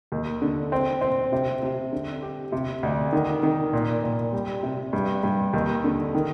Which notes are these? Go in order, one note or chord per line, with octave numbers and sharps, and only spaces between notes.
D#2
D3
C4
C4
C3
C3
D3
G4
C3
D2
D#3
D#3
A#2
A#2
G3
C3
G2
G2
D#2
D3
D#3